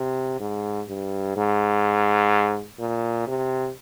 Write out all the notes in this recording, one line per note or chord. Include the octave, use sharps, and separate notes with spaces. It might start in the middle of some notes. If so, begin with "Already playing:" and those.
Already playing: C3
G#2
G2
G#2
A#2
C3